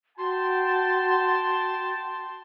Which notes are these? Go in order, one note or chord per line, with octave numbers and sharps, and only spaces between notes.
F#4 G5 A5 C6